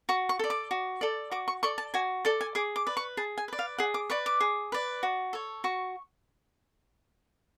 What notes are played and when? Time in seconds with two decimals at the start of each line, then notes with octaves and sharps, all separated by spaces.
0.09 F#4 C#6
0.29 C#6
0.39 A4 D5
0.50 D6
0.71 F#4
1.01 A4 D5
1.31 F#4 D6
1.48 C#6
1.63 A4 D5 C#6
1.78 A5
1.94 F#4 G#5
2.25 A4 D5 A5
2.41 G#5
2.55 G#4 D6
2.76 D6
2.87 B4 D5
2.97 C#6
3.17 G#4 A5
3.38 G#5
3.48 B4 D5
3.59 F5
3.78 G#4 F#5
3.94 D6
4.10 B4 D5 C#6
4.26 D6
4.40 G#4
4.72 B4 D5
5.03 F#4
5.33 A4 C#5
5.64 F#4 C#6